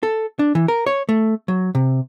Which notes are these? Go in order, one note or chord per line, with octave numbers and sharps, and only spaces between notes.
A4
D4
E3
A#4
C#5
A3
F#3
C3